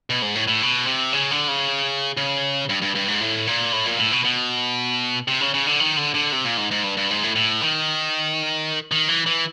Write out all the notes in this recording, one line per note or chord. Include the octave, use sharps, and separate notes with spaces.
B2
G#2
A2
A2
B2
C3
C#3
D3
C#3
C#3
G2
G2
G2
G#2
A2
A#2
A2
A#2
A2
B2
B2
C3
C#3
C#3
D3
D#3
D3
D3
C3
A#2
G#2
G#2
G2
G2
G#2
A2
A2
D#3
D#3
E3
E3